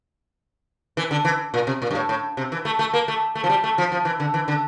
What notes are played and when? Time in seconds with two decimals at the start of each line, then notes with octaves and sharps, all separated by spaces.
0.97 E3
1.11 D3
1.25 E3
1.54 A#2
1.67 C3
1.82 A#2
1.91 G2
1.95 A2
2.09 A2
2.37 C3
2.52 E3
2.65 A3
2.79 A3
2.93 A#3
3.08 A3
3.35 A3
3.44 F3
3.49 G3
3.64 A3
3.78 F3
3.92 F3
4.05 E3
4.20 D3
4.34 E3
4.48 D3